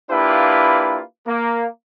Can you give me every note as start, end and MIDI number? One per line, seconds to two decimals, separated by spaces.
0.11 1.01 58
0.11 1.01 62
0.11 1.01 64
0.11 1.01 65
0.11 1.01 67
0.11 1.01 71
1.27 1.67 58